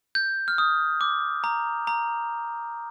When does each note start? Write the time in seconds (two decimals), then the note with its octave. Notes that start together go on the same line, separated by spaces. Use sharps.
0.15 G6
0.48 F6
0.58 D#6
1.01 D6
1.44 A#5
1.87 A#5